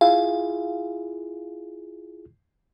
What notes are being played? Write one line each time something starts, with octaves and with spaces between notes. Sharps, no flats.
E4 F4 G#4 F5